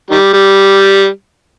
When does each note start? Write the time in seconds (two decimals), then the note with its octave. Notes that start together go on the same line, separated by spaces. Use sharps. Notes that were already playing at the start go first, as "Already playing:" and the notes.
0.11 D#3 G3
0.33 G3